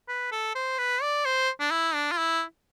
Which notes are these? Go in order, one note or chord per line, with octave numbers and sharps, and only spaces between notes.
B4
A4
C5
B4
D5
C5
D4
E4
D4
F4
E4